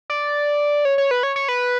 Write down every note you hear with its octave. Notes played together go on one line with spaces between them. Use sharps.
D5
C#5
C#5
B4
C#5
C#5
B4